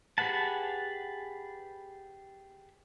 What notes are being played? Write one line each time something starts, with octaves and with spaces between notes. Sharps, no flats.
G4 G#4 B4 F#5 A5